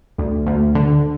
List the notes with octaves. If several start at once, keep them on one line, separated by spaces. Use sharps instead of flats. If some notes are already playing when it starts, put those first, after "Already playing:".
D2
D2
D3